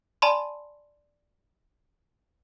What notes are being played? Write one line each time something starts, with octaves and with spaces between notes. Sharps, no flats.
D5 G#5 A5 B5 C6